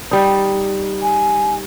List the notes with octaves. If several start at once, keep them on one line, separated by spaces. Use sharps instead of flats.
G3 D#4
G#5